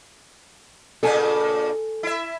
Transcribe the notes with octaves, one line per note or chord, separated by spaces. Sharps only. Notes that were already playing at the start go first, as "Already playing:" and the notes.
A#2 C#3 D4 A4 G#5
E4 E5